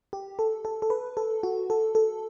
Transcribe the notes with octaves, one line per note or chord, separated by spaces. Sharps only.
G4
A4
A4
A4
B4
A4
F#4
A4
A4